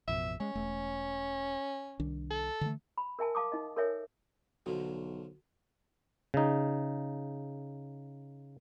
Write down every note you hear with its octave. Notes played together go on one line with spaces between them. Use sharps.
A1 F2 B2 E5
G#3 C#4
E1 A3
C2 D#3 D4
A4
D3 E3 A3
B5
A#4 E5 G#5 A5
F5 A5 D6 D#6
D#4 D#5
A4 A#4 C#5 E5 G#5
B1 D3 F3 F#4
C#3 D#4